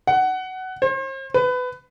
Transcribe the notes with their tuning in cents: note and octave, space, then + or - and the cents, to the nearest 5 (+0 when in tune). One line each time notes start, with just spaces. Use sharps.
F#5 +15
C5 +40
B4 +20